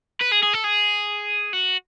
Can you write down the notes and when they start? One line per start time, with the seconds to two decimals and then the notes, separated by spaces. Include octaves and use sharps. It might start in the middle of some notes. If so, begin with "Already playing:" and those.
0.21 B4
0.31 G#4
0.43 G#4
0.53 A4
0.64 G#4
1.53 F#4